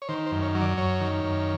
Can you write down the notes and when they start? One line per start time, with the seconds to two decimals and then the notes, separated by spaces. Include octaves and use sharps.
0.02 C#5
0.09 D#3 C5
0.26 C5
0.31 F#2
0.43 C#5
0.55 F#3
0.61 D5
0.78 F#2 C#5
1.00 D#3
1.24 F#2